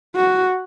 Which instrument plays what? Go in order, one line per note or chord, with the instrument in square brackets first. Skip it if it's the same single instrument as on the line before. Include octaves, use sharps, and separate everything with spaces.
[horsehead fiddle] F#4